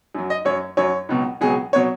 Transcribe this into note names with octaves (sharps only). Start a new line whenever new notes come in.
F#2 F#3
D#5
F#2 F#3 C#5
F#2 F#3 C#5
C#2 B2 F#3
C#2 B2 F#3 G#4
B2 F#3 C#5